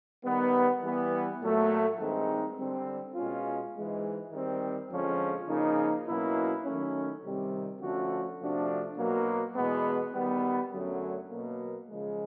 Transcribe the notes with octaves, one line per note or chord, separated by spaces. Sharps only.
D#3 G3 B3
E3 G3 B3
A#2 F#3 A3
G2 D#3 G#3 C4 D#4
D3 G3 C4
B2 G#3 C#4 F4
G#2 E3 G#3
D#3 G3 C4
F2 D3 F3 G#3 C#4
C#3 F3 A#3 D#4
B2 F#3 A#3 C#4 E4
D#3 F#3 A3 C#4
C3 D#3 G3 C4
D3 F3 A3 C#4 F#4
C3 F3 A3 D4 F#4
B2 F#3 A#3
E2 B2 G#3 B3
D#3 G3 B3
F#2 D3 F#3 A3 C#4
B2 F#3 A#3
C#3 F3 G#3